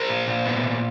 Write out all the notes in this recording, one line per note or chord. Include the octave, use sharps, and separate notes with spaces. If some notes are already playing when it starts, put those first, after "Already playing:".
Already playing: A#4 C5
A#2
A#2
B3
A#2